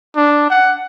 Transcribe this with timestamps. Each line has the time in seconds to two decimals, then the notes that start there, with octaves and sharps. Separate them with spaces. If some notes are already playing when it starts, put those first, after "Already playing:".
0.16 D4
0.50 F#5